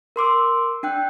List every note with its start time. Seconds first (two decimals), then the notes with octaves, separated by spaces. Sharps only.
0.16 A#4 C6 D6 E6
0.83 D4 G5 F#6